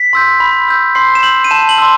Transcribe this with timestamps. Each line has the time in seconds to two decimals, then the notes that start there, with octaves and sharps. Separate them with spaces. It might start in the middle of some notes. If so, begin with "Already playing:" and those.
Already playing: B6
0.13 C6 E6 G6
0.40 B5
0.68 E6 G6
0.95 C6 C7
1.15 E7
1.23 E6 G6 F#7
1.44 D#7
1.51 A5 E7
1.69 F#7
1.78 C6 E6